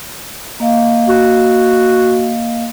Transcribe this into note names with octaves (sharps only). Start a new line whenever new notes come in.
A#3 D#5 F5
F#4